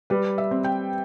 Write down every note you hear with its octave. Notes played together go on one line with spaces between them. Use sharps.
G3 B4
E5
C4
G5